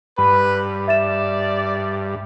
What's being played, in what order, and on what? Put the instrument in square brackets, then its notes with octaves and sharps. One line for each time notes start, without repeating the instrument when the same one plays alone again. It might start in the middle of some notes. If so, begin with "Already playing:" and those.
[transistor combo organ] G2 [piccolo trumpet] B4 [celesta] B5
[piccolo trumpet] D5 [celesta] E5 A6 E7